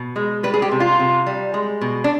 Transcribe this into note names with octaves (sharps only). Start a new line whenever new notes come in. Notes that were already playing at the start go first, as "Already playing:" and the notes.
Already playing: B2
G#3
G3 B4
G#4
G4
C3
F4
C3
G3
G#3
B2
D4